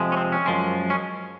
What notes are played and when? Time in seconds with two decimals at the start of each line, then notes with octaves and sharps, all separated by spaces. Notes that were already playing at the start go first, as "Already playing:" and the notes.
Already playing: F2 C3 F3 G#3
0.12 C#4
0.17 C4
0.32 C#4
0.46 F#2 F3 G#3
0.90 C#4